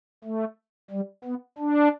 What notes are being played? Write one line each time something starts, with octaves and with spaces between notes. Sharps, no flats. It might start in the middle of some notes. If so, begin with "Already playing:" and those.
A3
G3
B3
D4